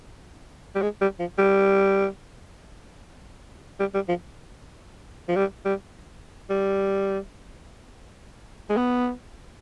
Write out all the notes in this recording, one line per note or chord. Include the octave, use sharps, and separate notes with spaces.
G3
G#3
G3
F3
G3
G3
G3
F3
F3
G3
G3
G3
G#3
B3